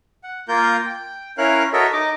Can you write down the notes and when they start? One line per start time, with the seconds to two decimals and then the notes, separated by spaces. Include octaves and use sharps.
0.23 F#5
0.48 A#3 F4 A#4 G6
0.86 G5
1.38 C#4 E4 A#4 C#5 F5 F#6
1.73 F#4 A4 A#4 C#5 D#5 E5
1.93 D#4 D#5 D6